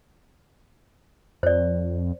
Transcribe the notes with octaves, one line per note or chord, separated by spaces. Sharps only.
F2 C5 D5